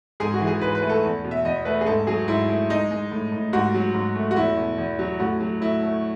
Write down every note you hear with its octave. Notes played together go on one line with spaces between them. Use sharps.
G#2 G#4
F#4
E3
G#4
G#2 B4
B4
A3
A4
E2
B2
E5
E2 D#5
A3 B4
G#4
G#2 A4
F#3 G#4
G#2 E4
A3
G#3 D#4
G#3
A2
A2
G#2 F#4
F#3
G#2
A3
F#4
E2 E4
B2
E2
F#3
A2 F#4
F#3
A2 E4
A3